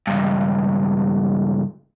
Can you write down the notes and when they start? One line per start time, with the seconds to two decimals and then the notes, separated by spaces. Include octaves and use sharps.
0.07 C#2 G2